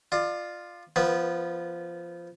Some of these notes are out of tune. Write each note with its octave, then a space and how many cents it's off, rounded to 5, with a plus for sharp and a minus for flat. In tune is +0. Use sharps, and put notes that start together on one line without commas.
F4 +0 D5 +35
F3 -15 B3 +0 B4 -25